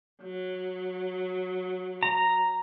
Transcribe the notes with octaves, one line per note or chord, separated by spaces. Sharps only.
F#3
A#5